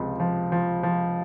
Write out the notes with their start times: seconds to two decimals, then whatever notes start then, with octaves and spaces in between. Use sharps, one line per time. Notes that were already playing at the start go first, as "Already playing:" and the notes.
Already playing: C#2 C3 F3
0.20 F3
0.52 F3
0.83 F3